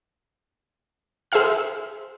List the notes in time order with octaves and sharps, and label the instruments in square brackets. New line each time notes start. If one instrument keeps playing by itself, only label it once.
[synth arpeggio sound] G#4 C5 E5 F5 F6